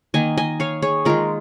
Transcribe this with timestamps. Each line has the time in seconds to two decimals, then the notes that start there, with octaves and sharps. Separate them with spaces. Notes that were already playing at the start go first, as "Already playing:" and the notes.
0.14 D#3 A#3 D#5 G#5
0.38 D#5 G#5
0.60 C#5 F5
0.82 G#4 C#5
1.05 D#3 G#3 F4 A#4